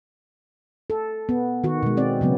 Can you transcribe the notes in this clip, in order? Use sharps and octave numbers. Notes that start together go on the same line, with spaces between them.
A4
B3
D#3 F#4
B2 G#3
C4 D5
C#3 F#3 B3